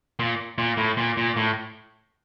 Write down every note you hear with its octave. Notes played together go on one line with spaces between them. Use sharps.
A#2
A#2
A2
A#2
A#2
A2